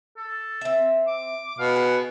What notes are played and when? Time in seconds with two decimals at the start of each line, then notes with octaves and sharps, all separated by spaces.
0.17 A4
0.61 C4 E5
1.07 D6
1.59 B2 F5
1.76 G#4 F#5